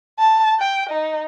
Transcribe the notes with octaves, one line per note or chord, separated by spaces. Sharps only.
A5
G5
D#4